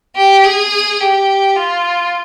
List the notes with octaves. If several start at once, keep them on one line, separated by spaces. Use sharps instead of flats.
G4
G#4
G4
F4